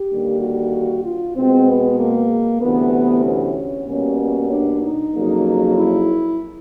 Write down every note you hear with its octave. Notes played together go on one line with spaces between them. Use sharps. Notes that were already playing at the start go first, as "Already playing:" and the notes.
Already playing: G4
D#2 D3 G3 A#3
F#4
F4
B2 G#3 C4
B3
A#3
D2 C3 E3 B3
C#4
B2 G3 A#3 C#4
D4
D#4
F2 C#3 F#3 A#3
E4